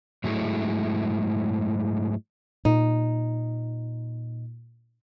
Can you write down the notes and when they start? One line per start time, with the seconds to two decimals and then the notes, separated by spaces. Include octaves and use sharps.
0.24 G#2 F#3 G#3 A3 E4
2.65 A#2 D#4